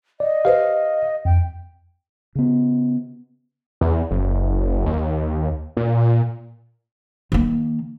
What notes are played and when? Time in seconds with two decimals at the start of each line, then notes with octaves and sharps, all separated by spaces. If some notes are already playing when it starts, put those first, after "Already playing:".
0.20 D5 D#5
0.45 G4 B4 C5 F5
1.25 F2 G5
2.35 C#3 B3
3.81 E2
4.11 F#1
4.86 D#2
5.77 A#2
7.32 D#3 A#3